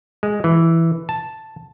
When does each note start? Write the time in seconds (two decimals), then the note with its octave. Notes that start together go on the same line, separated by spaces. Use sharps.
0.23 G#3
0.44 E3
1.09 A5